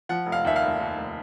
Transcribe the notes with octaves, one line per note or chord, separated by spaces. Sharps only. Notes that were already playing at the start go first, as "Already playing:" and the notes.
F3 F#5
F1
F5
D#2 E5
F5
F1
D#2
F1